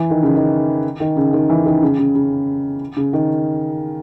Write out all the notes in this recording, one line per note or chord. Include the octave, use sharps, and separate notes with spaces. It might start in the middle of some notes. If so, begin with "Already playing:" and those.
Already playing: E3
D#3
C#3
D#3
D#3
C#3
D#3
E3
D#3
C#3
C#3
C#3
C#3
D#3